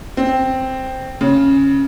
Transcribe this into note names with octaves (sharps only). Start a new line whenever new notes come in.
C4
C#3